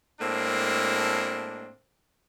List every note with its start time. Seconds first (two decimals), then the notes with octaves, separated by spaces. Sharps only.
0.21 A2 G#3 A#3 C4 D4